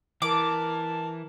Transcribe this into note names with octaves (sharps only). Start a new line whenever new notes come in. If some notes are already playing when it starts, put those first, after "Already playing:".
E3 A#4 A5 D6